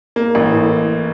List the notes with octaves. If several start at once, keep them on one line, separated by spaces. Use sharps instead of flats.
A#3
A1
A2